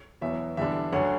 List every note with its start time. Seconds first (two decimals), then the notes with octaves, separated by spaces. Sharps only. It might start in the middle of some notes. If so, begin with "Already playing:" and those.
0.21 E2 B2 F#3 E5
0.57 E2 D3 G3 D4 E5
0.92 D2 D3 F#3 C#4 F#5